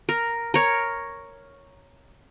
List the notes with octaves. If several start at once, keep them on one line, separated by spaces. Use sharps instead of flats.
A#4
A#4 C#5